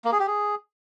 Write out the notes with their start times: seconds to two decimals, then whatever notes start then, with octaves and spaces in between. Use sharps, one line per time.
0.05 A#3
0.12 G#4
0.20 G4
0.27 G#4